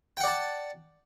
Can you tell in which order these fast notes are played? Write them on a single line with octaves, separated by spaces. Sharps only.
G5 F#5 D5 A5